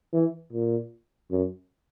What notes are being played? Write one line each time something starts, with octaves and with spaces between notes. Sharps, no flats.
E3
A#2
F#2